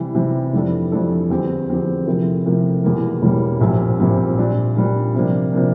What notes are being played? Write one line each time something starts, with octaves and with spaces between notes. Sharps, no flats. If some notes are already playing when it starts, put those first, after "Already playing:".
Already playing: C3 E3 G3
C3 E3 G3
F2 E3 G3 D4 A4
F2 E3 G3 D4 A4
E2 D3 F3 C4 G4
E2 D3 F3 C4 G4
C3 F3 A3 E4 A#4
C3 F3 A3 E4 A#4
E1 E2 E3 G3 A#3
E1 E2 E3 G3 A#3
A#1 A#2 G3 C4
A#1 A#2 G3 C4
A#2 G3 D4
A#2 G3 D4
C3 F3 A#3 D4
C3 F3 A#3 D4